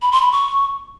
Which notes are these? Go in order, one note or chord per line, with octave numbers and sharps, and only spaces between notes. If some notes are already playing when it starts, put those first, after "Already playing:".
B5
C6
B5
C#6